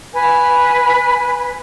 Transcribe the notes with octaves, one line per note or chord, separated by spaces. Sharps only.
B4 G#5